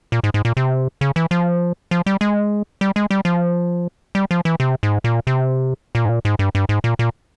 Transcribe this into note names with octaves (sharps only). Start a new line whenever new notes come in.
A#2
G#2
G#2
A#2
C3
C#3
E3
F3
F3
G3
G#3
G3
G#3
G3
F3
G3
F3
E3
C3
G#2
A#2
C3
A#2
G#2
A#2
G#2
G2
G2
G#2
A#2
A#2